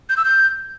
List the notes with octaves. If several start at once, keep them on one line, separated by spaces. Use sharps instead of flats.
G6
E6
G6